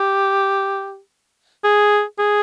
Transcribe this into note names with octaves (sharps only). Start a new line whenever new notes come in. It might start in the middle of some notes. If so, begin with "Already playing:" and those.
Already playing: G4
G#4
G#4